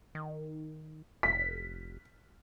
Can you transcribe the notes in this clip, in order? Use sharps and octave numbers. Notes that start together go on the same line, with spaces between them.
D#3
F1 B6